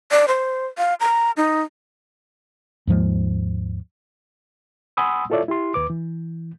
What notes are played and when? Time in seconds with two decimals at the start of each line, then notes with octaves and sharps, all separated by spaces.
0.11 D5
0.28 C5
0.78 F5
1.00 A#5
1.37 D#4
2.87 D#2 G#2 F3 G#3
4.97 F#5 G#5 B5 C6 D#6 E6
5.30 E4 F4 A4 C#5 D5 E5
5.48 E4 G4 C6
5.74 D#2 B4 D6
5.90 E3